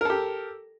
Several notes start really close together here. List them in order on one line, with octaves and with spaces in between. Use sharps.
A#4 A4 G4